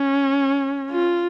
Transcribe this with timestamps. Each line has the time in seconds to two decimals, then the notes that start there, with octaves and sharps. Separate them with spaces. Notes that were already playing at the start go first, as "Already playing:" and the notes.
Already playing: C#4
0.91 F4